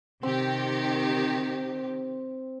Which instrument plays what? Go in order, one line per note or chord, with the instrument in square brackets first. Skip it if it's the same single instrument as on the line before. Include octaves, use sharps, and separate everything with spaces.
[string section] C3 D#3 G4 [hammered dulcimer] C4